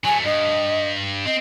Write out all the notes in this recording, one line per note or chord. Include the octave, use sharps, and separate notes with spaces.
F#3 A3 G#5
G2 D#5
C4 D#5